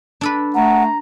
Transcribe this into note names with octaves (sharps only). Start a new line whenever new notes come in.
D4 A4 B4
A3 F#5 A#5